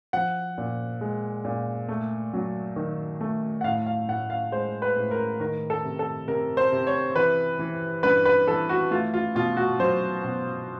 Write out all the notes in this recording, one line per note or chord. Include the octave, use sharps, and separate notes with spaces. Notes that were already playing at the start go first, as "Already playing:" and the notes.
F3 F#5
A#2
G#3
A#2
A3
F#3
D#3
A3
F#5
A2 F5
F5
A2 F#5
F5
G#3 C5
B4
A2
A#4
D#3 A#4
A4
C3
A4
C3 A#4
C5
C3
C#5
E3 B4
E3
G2 B4
B4
E3 A4
F#4
A3 F4
F4
B2 F4
F#4
F#3 C5
B2